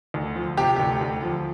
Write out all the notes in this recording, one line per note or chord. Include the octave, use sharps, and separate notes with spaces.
D2
F3
C3 G4
G4
D2
D2
F3